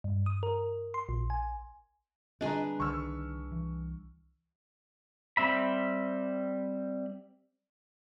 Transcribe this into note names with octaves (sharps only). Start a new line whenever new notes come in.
G2
D#6
A#4
C6
A#1
G#5
D3 G3 C4 D4 G#4 B4 D#5 A#5
C2 D3 D#3 C#6 E6 F6
E3
G3 C4 E5 B5